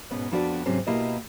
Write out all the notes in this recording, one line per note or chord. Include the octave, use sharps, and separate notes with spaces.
G#2 B2 B3 C#4
F2 B3 D4 F#4 B4 D5
G#2 C3 F#3 C4 C#4
B2 A#3 E4 G4 B4 D#5